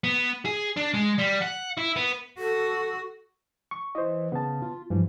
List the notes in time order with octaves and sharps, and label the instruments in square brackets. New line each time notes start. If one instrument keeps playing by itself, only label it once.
[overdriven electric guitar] B3
G#4
D4
G#3
G3
F#5
E4
B3
[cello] F#4 [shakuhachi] A4
[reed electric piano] C#6
[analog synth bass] E3 [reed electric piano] C5 D#5
[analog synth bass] C#3 [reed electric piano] B3 A5
[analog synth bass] F4
[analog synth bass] G2 [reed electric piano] E3 F3 G3